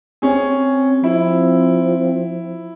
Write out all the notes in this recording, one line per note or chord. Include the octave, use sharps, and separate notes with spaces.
C4 C#4 G#4
F3 E4